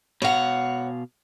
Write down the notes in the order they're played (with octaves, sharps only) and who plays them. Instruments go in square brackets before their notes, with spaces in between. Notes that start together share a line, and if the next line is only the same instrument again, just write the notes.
[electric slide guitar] B2 F5 [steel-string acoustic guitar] C#5 F#5